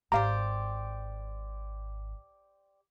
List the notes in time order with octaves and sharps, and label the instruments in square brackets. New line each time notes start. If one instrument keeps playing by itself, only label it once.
[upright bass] G#1 [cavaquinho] G4 C5 D5 [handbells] F5 A#5